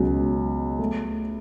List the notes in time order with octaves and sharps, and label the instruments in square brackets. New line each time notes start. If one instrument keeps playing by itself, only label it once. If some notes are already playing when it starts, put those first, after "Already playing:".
Already playing: [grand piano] C#2 B2 F#3
A3